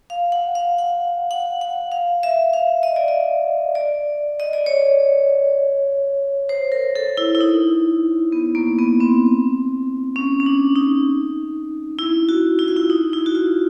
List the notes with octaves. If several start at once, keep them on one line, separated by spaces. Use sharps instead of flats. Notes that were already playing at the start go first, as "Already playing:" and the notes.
F5
F#5
F5
F#5
F#5
F#5
F5
E5
F5
D#5
D5
D#5
D5
D#5
D5
C#5
C5
A#4
A4
E4
E4
D#4
B3
A#3
B3
C4
C#4
C#4
D4
D#4
E4
F#4
E4
F4
E4
D#4
E4
F#4
F4